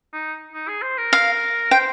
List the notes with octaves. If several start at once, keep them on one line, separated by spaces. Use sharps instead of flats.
D#4
D#4
G#4
C5
A#4
F5
C5 G5